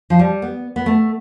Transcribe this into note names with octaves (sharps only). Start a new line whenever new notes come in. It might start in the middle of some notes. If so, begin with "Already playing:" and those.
F3
G3
B3
B3
A3